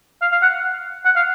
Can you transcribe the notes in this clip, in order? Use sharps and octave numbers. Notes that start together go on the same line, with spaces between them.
F5
F5
F#5
F#5
F5